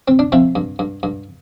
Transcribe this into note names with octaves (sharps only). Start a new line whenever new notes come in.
C4
D4
F3 C4 E4
G2
G2
G2